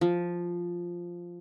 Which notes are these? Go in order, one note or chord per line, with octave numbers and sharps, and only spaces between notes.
F3